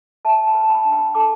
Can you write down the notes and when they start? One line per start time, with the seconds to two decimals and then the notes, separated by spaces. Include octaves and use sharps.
0.25 B4 E5 A5
0.47 G5 B5
0.55 B4
0.63 A5
0.70 G5 B5
0.85 D4
0.92 G5 B5
1.15 A4 A5 D6